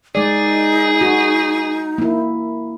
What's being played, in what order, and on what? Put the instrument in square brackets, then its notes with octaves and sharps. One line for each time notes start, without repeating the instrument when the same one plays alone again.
[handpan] G#3 D5 [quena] D#4 [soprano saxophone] G#4
[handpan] F#4
A#3 E4